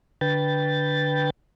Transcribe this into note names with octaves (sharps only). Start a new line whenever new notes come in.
D3 B4 G5 A6